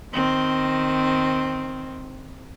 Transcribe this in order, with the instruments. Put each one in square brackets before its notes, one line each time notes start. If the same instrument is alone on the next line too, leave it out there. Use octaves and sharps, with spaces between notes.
[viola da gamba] D#3 C4